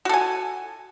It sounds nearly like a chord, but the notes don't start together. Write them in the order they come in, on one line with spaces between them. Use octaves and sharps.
F#4 A4 G#5